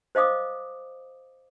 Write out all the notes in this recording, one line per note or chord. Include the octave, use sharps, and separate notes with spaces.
C5 D#5 F5 D6 D#6